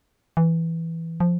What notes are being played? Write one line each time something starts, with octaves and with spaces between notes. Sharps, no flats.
E3
F3